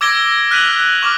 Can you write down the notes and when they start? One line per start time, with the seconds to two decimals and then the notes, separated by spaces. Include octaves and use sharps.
0.01 D6 E6 G#6 A#6 D7 G7
0.51 F6 F#6 B6 D#7 F7 F#7
1.02 C#6 D6 F6